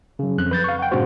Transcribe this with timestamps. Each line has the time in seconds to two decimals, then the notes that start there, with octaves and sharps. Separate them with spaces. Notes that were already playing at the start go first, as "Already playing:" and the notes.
0.19 C#3 F#3
0.38 F2 F#6
0.51 B4 G6 A6
0.64 F5 C#6
0.79 F#5 G5
0.91 G2 A#2 C#3 B3 F#4 C5